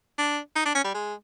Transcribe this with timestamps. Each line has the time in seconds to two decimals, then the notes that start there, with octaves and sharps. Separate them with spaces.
0.18 D4
0.56 D#4
0.65 D4
0.75 C#4
0.84 G3
0.94 G#3